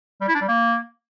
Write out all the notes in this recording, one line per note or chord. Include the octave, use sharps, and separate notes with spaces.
G3
E4
D4
G3
A#3